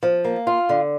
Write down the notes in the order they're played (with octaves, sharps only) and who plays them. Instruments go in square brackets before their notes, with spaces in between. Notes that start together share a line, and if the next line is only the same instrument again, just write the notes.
[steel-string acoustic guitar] F3
A#3
F4
D3